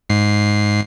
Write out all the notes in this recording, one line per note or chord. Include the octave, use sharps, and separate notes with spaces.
G#2 C7